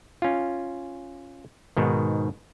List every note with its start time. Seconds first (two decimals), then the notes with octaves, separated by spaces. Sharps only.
0.22 C#4 F4
1.77 G#2 B2 D#3